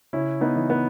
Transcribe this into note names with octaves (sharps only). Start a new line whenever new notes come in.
C#3 C#4 E4
B3 D#4
E3
B3